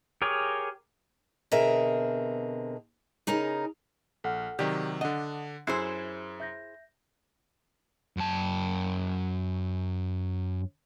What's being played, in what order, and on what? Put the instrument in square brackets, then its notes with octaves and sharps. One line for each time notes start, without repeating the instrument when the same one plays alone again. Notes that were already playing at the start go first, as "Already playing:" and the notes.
[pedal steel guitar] G4 G#4 A#4 C#5
[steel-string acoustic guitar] B2 D3 C4 G#4 A#4 E5
C#3 D#4 G#4 A#4
[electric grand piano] A#1 [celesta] A4 F#5 F6
[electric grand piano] C3 D#3 F#3 [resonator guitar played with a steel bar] G4 [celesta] D5
[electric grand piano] D3 D4 [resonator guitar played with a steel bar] D#5 [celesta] F#5
[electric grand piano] F#2 [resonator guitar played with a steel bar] E4 G#4 C5 [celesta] F#6 C7 C#7
[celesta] E5 G6 A#6
[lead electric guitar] F#2 A5